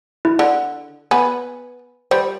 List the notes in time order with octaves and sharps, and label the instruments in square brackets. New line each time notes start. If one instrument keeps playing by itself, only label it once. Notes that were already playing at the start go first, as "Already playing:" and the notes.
[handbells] E4
[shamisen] D3
[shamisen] B3 [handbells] G#5
[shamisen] G3 [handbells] C5